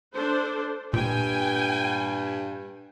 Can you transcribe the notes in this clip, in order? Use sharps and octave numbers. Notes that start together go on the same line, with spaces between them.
D4 A4 C5
G2 A#2 G5 G#5